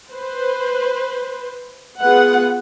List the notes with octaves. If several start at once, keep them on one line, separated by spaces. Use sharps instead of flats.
B4 C5
B3 F4 G#4 B4 F#5